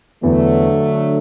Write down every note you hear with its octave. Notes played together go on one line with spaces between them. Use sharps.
E2 D3 E3 F#3 A3